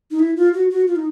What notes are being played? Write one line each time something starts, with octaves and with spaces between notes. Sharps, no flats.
D#4
E4
F4
F#4
F#4
F4
D#4